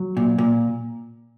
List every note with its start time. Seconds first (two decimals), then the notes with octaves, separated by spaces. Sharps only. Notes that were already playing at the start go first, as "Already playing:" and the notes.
Already playing: F#3
0.17 A#2
0.38 A#2